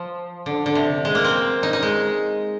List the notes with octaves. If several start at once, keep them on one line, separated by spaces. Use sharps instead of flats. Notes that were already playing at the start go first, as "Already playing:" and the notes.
Already playing: F3
D3
D3
C3
G#3
A#3
C4
D#4
D#4
G#3